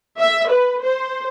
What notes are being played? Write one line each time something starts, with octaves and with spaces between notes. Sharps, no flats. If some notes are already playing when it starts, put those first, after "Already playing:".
E5
B4
C5